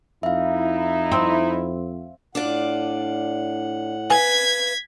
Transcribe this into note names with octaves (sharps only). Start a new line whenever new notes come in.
F2 D#4 E4 E5 F5
C4
A2 D4 F4 D5 F#5
B4 F5 G#5 G#6 B6